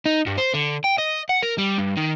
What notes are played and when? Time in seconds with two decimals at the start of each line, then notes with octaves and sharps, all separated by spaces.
0.06 D#4
0.27 G2
0.38 C5
0.54 D3
0.84 G5
0.98 D#5
1.29 F#5
1.43 A#4
1.58 G3
1.79 G2
1.97 D#3